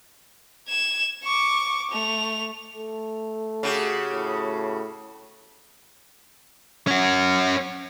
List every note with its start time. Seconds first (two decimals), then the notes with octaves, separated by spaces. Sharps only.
0.68 G#6 E7
1.24 C#6 D6
1.91 A3 F7
2.74 A3
3.63 C#3 F#4 G4
4.12 A2
6.87 C#4 F#4